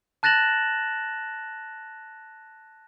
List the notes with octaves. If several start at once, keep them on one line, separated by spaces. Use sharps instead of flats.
A5 F#6 A6 A#6 E7 F#7